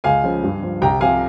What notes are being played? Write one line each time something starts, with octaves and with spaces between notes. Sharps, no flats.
C#2 F5 G#5
C#3 F3
G2
F3
C2 G5 A#5
C3 F3 F5 G#5